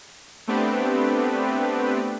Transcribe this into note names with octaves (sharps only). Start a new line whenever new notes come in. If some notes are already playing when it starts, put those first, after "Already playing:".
A3 B3 C4 D4 G4 B4